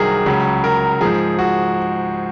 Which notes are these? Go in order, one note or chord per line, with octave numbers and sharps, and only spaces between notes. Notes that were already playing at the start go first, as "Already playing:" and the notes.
Already playing: C2 C3 D#3 F#3 G#4 A#4
C#2 C#3 F#3
A#4
G#2 F3 G#4
F#4